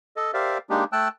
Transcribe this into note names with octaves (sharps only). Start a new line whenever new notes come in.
A4 D#5
G4 A#4 C5 D5 E5 F5
G#3 A#3 D4 D#4 G4
A3 G5 A5 E6 F#6